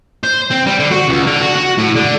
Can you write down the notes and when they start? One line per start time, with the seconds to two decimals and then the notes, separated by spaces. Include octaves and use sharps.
0.23 C5
0.50 C4
0.66 G3
0.79 D3
0.91 F#4
1.09 C#2
1.27 D3
1.41 F#4
1.56 F#4
1.78 A2
1.96 D3